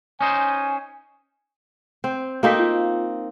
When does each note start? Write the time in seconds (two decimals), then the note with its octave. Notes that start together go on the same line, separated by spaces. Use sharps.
0.21 C#4 D#4 C5 G#5
2.04 C4 G6
2.43 A#3 C4 D#4 F#4 A4 B6
2.59 F4